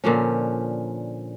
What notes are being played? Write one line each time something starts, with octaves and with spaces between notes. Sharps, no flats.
A#2 D3 F3 C#4